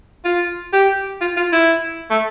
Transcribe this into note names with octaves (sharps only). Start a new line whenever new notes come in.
F4
G4
F4
F4
E4
A3